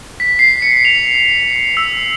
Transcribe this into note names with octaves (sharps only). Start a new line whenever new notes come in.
B6
C7
C#7
F7
E6